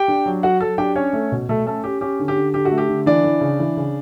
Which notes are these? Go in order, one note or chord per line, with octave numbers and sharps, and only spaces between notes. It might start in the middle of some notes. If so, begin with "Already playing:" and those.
Already playing: G4 G5
D4
F#3
F#3 F#4 F#5
F#3 A4 A5
D4 G4 G5
C#4 C#5
A3
B2
B2 A3 A4
A3 C#4 A4
C#4 G4
C#4 G4
D3
G4
D3
D3 G4
F#4
A3
G4
D3
E3 D4 D5
E3
C#3
E3
C#3